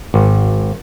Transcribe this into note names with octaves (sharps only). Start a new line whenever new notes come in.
G#1